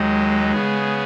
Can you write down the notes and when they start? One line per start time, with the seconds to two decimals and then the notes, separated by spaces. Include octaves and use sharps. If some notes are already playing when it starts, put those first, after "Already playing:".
Already playing: D#2 D#3 F#3 G#3 D#4
0.52 C#3 B3 G#4